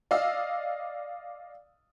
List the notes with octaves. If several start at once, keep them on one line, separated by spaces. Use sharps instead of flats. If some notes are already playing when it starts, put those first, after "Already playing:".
D5 D#5 F5 E6